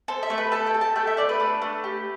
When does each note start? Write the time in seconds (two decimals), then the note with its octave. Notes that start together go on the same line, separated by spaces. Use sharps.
0.08 A4 C5
0.23 E5
0.30 A3
0.38 B4
0.52 A4 A5
0.67 G5
0.74 A4
0.81 A5
0.96 A3 G5
1.07 E5
1.17 D4 D5
1.29 B4
1.40 A3
1.62 A3
1.84 G4